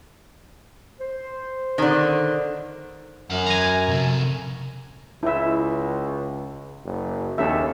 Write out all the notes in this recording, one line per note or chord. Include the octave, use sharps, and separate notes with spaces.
C5
D3 D#3
F#2 E5 F#5
G#5 A#5
C3 A4
C#2 E4 E5
F#1
D#2 C#4 A4 E5